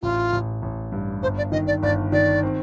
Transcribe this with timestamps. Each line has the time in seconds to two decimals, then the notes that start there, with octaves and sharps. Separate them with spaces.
0.02 A1 F4
0.33 A1
0.62 A1
0.92 G2
1.23 G1 C5
1.38 D5
1.52 D#3 D#5
1.67 D5
1.83 G1 D5
2.12 D#3 D5
2.43 C4